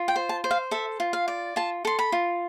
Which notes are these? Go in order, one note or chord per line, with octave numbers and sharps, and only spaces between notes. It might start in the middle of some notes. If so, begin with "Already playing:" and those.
Already playing: F4
G5
C5
A5
C5
F5
A4 E5
F4
F5
D5
F4 A5
A4 C6
B5
F4